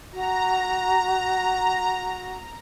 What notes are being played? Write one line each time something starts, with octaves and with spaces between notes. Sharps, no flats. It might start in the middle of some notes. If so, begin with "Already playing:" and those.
F#4 A#5